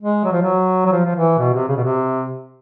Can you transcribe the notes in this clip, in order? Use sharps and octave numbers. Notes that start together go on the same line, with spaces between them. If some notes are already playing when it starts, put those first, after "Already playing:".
G#3
F#3
F3
F#3
F#3
F3
F3
E3
B2
C3
C#3
B2
C3